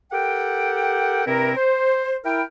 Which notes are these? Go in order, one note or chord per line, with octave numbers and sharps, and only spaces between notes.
G4 A4 A#4 F#5 G5
G2 C3 C4 E4 A#4
C5
E4 A#4 G5